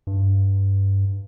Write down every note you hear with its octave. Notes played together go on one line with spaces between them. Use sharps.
G2